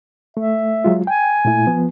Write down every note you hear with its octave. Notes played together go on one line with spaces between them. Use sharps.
A3 E5
F#3 G#3 F4
G5 G#5
A#2 A3 E4
F3 B3